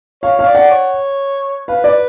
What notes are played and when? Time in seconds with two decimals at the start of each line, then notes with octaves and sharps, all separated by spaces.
0.23 C#5 F5
0.39 F5
0.47 D5
0.55 F#5
0.71 C#5
1.68 B4 F5
1.84 D5